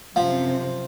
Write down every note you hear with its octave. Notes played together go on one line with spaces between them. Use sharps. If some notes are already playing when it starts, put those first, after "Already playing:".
F#2 C3 F3 F5